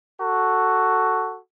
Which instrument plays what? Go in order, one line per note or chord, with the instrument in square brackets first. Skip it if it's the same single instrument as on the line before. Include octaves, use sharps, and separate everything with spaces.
[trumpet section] F#4 A4